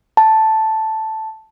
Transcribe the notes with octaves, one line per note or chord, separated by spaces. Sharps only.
A5